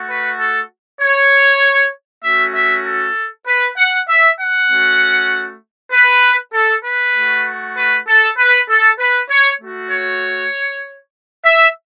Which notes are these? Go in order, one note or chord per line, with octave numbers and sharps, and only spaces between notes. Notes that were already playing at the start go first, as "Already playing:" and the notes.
Already playing: A3 F#4
B4
A4
C#5
A3 C#4 F#4 E5
E5
A4
B4
F#5
E5
F#5
A3 C#4 F#4
B4
A4
B4
A3 F#4
B4
A4
B4
A4
B4
C#5
A3 F#4
C#5
E5